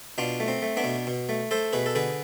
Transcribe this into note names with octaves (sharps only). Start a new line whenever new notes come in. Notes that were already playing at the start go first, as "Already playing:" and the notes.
B2 D4 F4
A3
C4
A3
B3 D4
B2
B2
A3
A3 A4 C5
B2 G#4 B4
A4
D3 G#4 B4